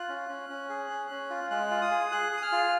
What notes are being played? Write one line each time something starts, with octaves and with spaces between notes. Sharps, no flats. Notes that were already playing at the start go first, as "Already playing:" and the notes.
Already playing: F4 F#6
C#4
C#4
C#4
G#4
C#4
C#4
F4
G#3 F#6
F4
D#6
G#4
G#4 F#6
G#4 D#6
F6
F4